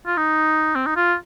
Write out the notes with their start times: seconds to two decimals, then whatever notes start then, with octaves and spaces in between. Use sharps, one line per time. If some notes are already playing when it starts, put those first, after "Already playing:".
0.06 F4
0.17 D#4
0.75 C4
0.86 D#4
0.96 F4